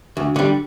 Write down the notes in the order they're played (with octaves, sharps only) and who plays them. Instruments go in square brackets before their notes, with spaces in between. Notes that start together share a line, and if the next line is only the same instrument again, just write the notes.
[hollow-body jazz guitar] D2
D3 G3